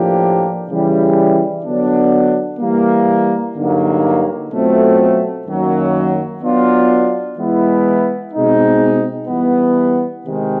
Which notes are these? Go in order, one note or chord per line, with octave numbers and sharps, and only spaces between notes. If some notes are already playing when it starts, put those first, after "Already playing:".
Already playing: A2 F3 A#3 D4 G4
C#3 E3 G3
D3 F#3 B3 D4
E3 G3 A#3
G2 D3 F#3 A#3 D#4
B2 F#3 A3 C4 F4
F#2 D#3 F#3 A#3
F#3 B3 D4 F4
E3 G#3 B3 E4
B2 G#3 C4 D#4
E3 G3 B3
C3 D#3 G#3